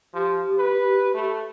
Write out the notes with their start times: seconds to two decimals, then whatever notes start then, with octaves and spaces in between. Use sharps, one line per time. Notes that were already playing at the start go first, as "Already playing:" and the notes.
0.14 F3 G4
0.58 B4
1.14 A3